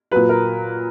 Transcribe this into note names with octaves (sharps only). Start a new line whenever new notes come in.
A#2 F#3 B4
A#4